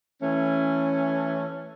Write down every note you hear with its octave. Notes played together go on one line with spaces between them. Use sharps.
E3 A3 C#4